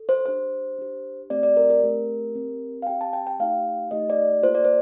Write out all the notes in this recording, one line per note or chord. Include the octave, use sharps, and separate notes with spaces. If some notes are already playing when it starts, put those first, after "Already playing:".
Already playing: A4
C5
D4 G4 C5
D4 G4
A3 C4 G4 D5
D5
A#4
A#4
A3 C4 G4
C4 G4
F5
C4 G4 G5
A5
G5
G5
A3 D#4 G4 F5
A3 D#4 G4 D#5
D5
A#3 F4 A4 C5
D5
C5